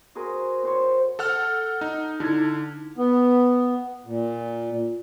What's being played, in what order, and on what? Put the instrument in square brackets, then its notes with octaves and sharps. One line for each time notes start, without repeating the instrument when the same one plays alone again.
[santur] F#4 G#4 A#4 C5
C4 C5 C#5
[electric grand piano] A4 F#5 F6
D#4
[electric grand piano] D3 [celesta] D#4 E4 G#6
[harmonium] B3
A#2